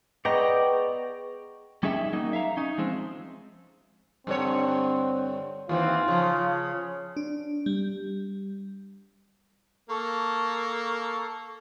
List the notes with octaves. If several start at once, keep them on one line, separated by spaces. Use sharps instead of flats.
B3 G#4 D5 D#5 G5 A#5 C#6
G3 C#4 D#4 G#4 E5 G5
F#3 A#3 D#4
E5 F5 A#5
C#4 D#4
F3 G#3 C4
G2 D3 C4 C#5
D#2 E3 C4 F4
C#3 F3
D4
G3
A#3 A4 C#6